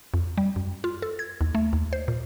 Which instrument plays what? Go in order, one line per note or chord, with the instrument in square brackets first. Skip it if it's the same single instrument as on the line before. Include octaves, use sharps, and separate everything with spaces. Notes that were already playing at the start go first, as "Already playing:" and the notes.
[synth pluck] F2
G3
F#2
F4
A4
G#6
D#2
A3
D#2
C5
A#2